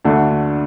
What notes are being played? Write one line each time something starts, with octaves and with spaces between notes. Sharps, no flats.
D2 D3 A3 D4 A4